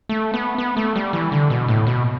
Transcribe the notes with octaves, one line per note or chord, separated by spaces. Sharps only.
A3
B3
B3
A3
G3
E3
D3
B2
A2
B2